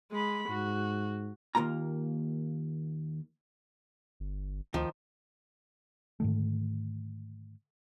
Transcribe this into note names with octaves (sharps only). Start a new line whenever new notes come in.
G#3 B5
G#2 F#4
D#2 A#2 A#3 F4 A#5
G1
D2 D#3 F3
G#2 D3 D#3 A3